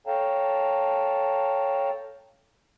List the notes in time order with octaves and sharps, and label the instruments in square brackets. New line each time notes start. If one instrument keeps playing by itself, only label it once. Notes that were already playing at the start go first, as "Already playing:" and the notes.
[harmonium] A4 C#5 F5 G5 A5 A#5